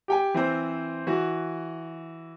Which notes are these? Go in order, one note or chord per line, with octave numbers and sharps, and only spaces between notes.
G4 G5 G#5
E3 C4 C5
E3 F#4